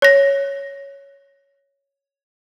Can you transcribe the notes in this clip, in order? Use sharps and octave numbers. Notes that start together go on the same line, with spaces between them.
C#5 A#6